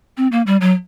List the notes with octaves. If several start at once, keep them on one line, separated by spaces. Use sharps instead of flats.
C4
A#3
G3
F#3